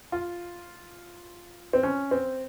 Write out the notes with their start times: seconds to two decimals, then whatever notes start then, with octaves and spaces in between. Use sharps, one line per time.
0.12 F4
1.73 C4
1.83 C#4
2.11 C4